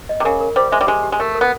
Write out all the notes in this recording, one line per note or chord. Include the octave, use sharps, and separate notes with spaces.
D#5
C3
C#3 A#4
A#4
G3 C5
G#3 E5
G3
G#3 G4
G4
G#3
A3 A#4
A#4
B3